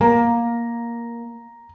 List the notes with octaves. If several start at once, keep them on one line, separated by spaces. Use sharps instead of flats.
A#3 A#5